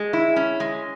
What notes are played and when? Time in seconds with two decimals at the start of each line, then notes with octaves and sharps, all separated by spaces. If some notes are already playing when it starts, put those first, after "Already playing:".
Already playing: G#3
0.13 E4
0.36 C#4
0.60 G#3